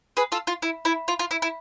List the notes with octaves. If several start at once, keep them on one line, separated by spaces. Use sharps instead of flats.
G#4 B4
F4 A4
F4
E4
E4
F4
F4
E4
E4